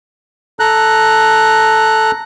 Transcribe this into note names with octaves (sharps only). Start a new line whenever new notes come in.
A4 A#5 F#6